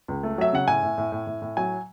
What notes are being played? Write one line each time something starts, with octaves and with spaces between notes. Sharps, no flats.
C#2
A3
F#3 E5
C#3 F#5
A2 G#5
A2
A2
A2
A2
A2
F#3 G#5